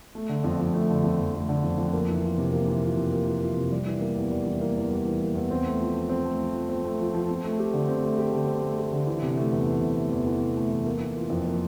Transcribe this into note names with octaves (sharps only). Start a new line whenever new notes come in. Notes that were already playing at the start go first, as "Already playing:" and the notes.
A3
D3
F2
F2
A3
D3
F2
F2
A3
D3
F2
F2
A#3
E3
F4
C3
A#3
E3
F4
C3
A#3
E3
F4
C3
G3
E3
A#3
E2
G3
E3
A#3
E2
G3
E3
A#3
E2
C4
A3
F3
F3
C4
A3
F3
F3
C4
A3
F3
F3
C4
A3
G4
D3
C4
A3
G4
D3
C4
A3
G4
D3
E3
C3
A3
E2
E3
C3
A3
E2
E3
C3
A3
E2
A#3
E3
F4
F2
A#3